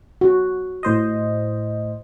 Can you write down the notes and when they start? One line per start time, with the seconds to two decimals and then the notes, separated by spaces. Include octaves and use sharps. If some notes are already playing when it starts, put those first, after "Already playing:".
0.21 F#4
0.83 A2 C5 D#5